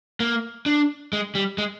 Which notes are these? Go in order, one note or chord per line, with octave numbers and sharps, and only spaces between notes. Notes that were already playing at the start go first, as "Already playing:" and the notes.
A#3
D4
G#3
G3
G#3